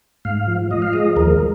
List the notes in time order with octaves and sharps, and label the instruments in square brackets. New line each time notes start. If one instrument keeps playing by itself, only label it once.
[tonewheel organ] G#2 F5
F3
F3 D#5
F5
G#3 D#5
D#2 A#4